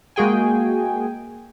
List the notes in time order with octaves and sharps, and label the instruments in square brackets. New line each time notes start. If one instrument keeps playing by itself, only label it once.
[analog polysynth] G#3 A#3 F#4 G#4 G5 G#5